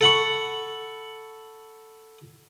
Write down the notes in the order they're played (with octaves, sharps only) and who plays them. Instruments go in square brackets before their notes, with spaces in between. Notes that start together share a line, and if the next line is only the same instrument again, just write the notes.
[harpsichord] A4 F#5 B5 C#6